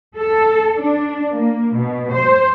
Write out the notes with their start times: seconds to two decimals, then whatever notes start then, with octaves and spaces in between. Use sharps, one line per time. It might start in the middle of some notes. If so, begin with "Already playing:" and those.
0.17 A4
0.77 D4
1.32 A#3
1.74 B2
2.12 C5